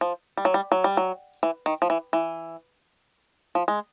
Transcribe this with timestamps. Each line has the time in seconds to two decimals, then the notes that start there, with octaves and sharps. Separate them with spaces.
0.01 F3
0.37 G3
0.45 F#3
0.54 G3
0.72 F#3
0.84 G3
0.97 F#3
1.43 E3
1.66 D#3
1.82 F3
1.90 E3
2.13 E3
3.55 F3
3.68 G#3